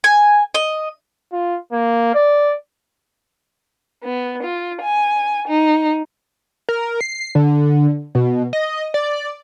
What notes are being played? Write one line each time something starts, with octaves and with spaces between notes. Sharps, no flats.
G#5
D#5
F4
A#3
D5
B3
F4
G#5
D#4
A#4
C7
D3
B2
D#5
D5